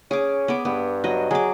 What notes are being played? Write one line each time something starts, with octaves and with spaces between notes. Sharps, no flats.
C#4 G#4 D6
B3 D6
G2 B3
F#3 D#5
F#3 G#4 D6